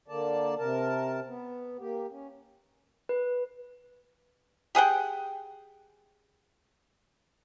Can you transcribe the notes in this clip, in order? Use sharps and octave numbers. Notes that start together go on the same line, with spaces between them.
D3 A#3 D5 A5
C3 A#4 A5
B3
A#3 G4
C#4
B4
G4 G#4 F#5 G5